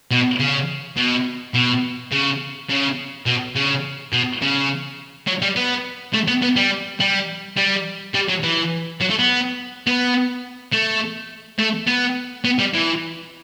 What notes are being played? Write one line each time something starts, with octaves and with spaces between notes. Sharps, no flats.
B2
C#3
B2
B2
C#3
C#3
B2
C#3
B2
C#3
F#3
G3
B3
A3
B3
B3
G3
G3
G3
G3
F#3
E3
F#3
A3
B3
B3
A3
A3
B3
B3
G3
E3